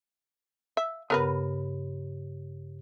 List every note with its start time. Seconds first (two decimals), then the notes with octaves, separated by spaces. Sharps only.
0.77 E5
1.10 G2 C#3 B3 A#4 B4